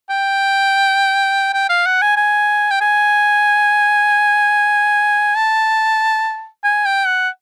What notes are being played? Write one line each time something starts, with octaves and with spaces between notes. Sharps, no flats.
G5
G5
F5
F#5
G#5
G#5
G5
G#5
A5
G#5
G5
F#5